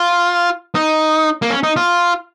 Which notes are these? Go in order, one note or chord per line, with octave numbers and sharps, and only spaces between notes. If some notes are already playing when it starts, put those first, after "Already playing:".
Already playing: F4
D#4
A#3
C#4
D#4
F4